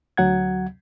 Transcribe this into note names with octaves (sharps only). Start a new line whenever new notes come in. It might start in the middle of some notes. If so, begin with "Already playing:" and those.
D2 F#3 F#5 G#6